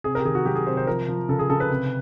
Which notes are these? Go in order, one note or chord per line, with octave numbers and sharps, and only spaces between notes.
C3 G#4
A#4
G4
D#3 G#4
F#4
F#3 G4
G#4
C3 C5
C5
F3 A#4
F3
C#3 A4
G#4
C#3 A4
B4
C3